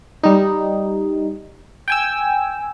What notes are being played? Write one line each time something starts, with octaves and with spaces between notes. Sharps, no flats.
G3 D#4
G5 G#5 E6